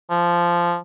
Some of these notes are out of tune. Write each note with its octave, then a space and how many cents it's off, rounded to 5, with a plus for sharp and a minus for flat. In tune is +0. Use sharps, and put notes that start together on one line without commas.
F3 -10